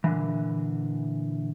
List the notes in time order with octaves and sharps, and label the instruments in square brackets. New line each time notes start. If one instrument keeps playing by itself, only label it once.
[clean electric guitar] A#2 D3 E3